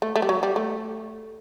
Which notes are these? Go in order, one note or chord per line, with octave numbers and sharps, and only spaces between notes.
A3
A3
G3
F#3
G3
A3